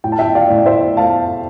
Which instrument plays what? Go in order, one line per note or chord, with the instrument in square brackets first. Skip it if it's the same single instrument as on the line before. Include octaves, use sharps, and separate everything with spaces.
[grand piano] A2 G5
A5
E5 G5
D5 F5
A2
C5 E5
A3 F5 A5